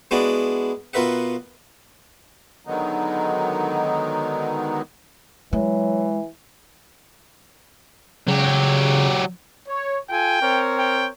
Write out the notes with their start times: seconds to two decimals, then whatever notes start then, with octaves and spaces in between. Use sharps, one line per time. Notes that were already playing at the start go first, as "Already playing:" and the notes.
0.11 G#3 B3 D4 E4 F#4 D5
0.93 B2 F4 A#4 B4 E5 F#5
2.67 D3 D#3 F#3 G#3 B3 D#4
5.53 E3 F#3 G#3
8.28 C#3 F#3 G4
9.68 C#5
10.10 F4 A4 G5 G#5
10.41 C4 A#4 C#5
10.79 G5